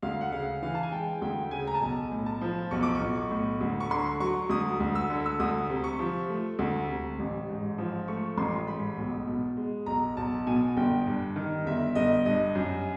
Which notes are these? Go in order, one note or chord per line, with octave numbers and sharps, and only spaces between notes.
D2 F5
F#5
C#3 F5
E3 F5
A5
G#5
G#3 G5
D2 G5
C#3 G#5
A#5
A5
B1 G#5
A2
A5
F3
B1 C#6
D6
C#6
B1
C#6
A2
D2
C#6
D3 C6
F#3 C#6
D2 D#6
D2
E6
D3
E6
D2 D#6
C3
C#6
F3
A3
D2
C3
A1
G#2
F3
A3 C#6
A1 C6
G#2 B5
B1
B2
G#3
B1 A#5
B1 A5
B2 G#5
G1 G5
G2
D#3
G1 E5
G1 D#5
G2 D#5
F#2